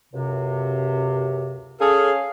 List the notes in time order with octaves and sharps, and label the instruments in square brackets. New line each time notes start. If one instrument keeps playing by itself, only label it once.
[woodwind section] C#2 F#2 C3
[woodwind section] C#4 F5 [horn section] G#4 A4